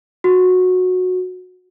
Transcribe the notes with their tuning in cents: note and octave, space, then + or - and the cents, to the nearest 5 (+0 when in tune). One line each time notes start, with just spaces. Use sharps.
F#4 -15